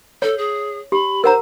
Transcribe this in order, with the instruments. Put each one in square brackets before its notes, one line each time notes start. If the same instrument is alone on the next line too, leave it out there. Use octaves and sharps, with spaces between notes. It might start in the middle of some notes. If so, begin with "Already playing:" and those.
[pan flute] A4 [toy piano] C#5
[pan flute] G#4
[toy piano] G4 [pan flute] B5
[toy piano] A#4 F#5 A#5 [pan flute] C5